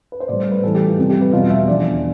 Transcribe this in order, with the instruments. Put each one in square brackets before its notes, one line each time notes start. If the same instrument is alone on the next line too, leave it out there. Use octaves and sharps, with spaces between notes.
[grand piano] B4
C5
A2 G3 D5
C5
B4
A2 E3 G3 A4
G4
F4
F2 C3 G3 G4
G4
B4
E2 B2 G3 F4
E5
E2 D3 F3 D5